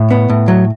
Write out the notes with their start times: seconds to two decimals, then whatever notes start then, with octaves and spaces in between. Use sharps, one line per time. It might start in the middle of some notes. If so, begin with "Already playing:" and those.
Already playing: A2
0.11 B3
0.30 A2
0.48 F#3